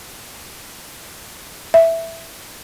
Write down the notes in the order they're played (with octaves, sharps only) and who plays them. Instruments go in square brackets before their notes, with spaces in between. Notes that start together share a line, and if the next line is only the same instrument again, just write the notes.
[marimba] E5